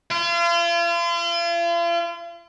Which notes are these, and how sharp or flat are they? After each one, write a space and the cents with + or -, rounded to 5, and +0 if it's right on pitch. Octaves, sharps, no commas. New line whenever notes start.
F4 -40